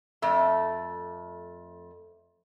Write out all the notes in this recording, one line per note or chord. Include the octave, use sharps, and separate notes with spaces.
F2 A3